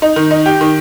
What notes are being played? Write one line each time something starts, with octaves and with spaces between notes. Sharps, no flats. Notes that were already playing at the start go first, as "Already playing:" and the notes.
D#4
D#3
D#4
G4
D#3